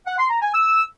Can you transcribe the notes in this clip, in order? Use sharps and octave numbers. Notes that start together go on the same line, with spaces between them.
F#5
C6
A#5
G#5
E6